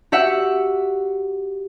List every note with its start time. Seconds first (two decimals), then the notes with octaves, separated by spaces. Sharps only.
0.12 F#4 G4 E5 F#5